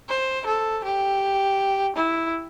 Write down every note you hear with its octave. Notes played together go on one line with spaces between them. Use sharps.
C5
A4
G4
E4